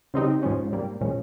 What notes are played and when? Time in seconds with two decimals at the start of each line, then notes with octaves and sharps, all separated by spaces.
0.14 C#3 G3 C4 D#4 G4
0.43 G#2 F3 G#3 C#4
0.72 G#2 G3 A#3
1.01 A#2 F3 G#3 C#4